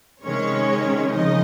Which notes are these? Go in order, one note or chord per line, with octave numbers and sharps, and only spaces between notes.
C3 D#3 G#3 C#4 C#5
C#3 F3 G#3 D#4 D#5